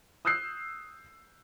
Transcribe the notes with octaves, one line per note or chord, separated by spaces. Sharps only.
D#6 E6 F#6 G6 C7